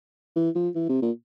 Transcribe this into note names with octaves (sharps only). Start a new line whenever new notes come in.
E3
F3
E3
C3
A#2